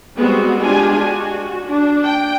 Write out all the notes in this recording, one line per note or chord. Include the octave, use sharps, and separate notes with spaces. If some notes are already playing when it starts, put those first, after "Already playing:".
G3 G#3 B3 C4 F#4
G#3 D4 F4 G4 G#5
F#4
D4
G5